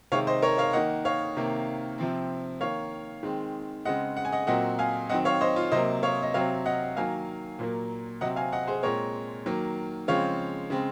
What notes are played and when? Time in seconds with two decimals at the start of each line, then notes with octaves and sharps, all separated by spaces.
0.12 C3 D#3 G#3 C#5 F5
0.27 C5 D#5
0.42 A#4 C#5
0.58 C#5 F5
0.73 D#3 A#3 D#5 F#5
1.05 C#5 F5
1.37 C3 D#3 A#3
1.98 C3 F3 C4
2.61 D#3 A#3 C#5 F5
3.23 D#3 G#3 C4
3.85 C#3 G#3 C4 D#5 F#5
4.17 F#5
4.25 G#5
4.32 D#5 F#5
4.47 A#2 F#3 C4 D#5 F#5
4.79 F5 G#5
5.10 D#3 F#3 C4 D#5 F#5
5.25 C#5 F5
5.41 C5 D#5
5.56 F4
5.72 C3 F#3 A#3 C5 D#5
6.03 C#5 F5
6.23 D#5
6.34 C3 F#3 C4 C#5 F5
6.66 D#5 F#5
6.97 D#3 F#3 A#3 F5 G#5
7.59 A#2 F#3 A#3
8.21 C3 F#3 C4 D#5 F#5
8.36 F5 G#5
8.53 D#5 F#5
8.67 G#4 C5
8.83 A#2 G#3 C4 A#4 C#5
9.46 D#3 F#3 A#3
10.08 C#3 F3 G#3 C4 C#5 F5
10.70 C#3 G#3 C4